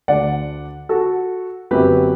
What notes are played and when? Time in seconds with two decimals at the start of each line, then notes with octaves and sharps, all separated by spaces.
0.08 D2 D3 A3 D5 F#5
0.89 F#4 A4
1.71 G1 F#2 F#3 C4 G4 B4